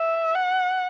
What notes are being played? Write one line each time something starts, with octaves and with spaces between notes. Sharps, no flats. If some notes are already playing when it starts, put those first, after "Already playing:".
Already playing: E5
F#5